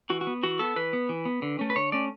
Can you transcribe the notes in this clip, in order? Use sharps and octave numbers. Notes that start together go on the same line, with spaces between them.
E3 F#4
F#4
B3
E3 F#4
B3 A4
E3 B4
B3
E3
B3
D3
A3 C#4
B4
D3 C#5
A3 C#4 D5